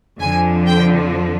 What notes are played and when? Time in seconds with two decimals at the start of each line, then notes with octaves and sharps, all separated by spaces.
0.20 F2 D3 F3 G#5
0.66 G5